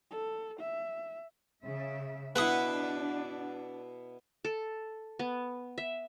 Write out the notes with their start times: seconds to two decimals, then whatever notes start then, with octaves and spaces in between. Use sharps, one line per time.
0.11 A4
0.59 E5
1.63 C#3 E5
2.36 B2 D4 E4 B4 F#5 D#6
4.45 A4
5.19 B3
5.78 E5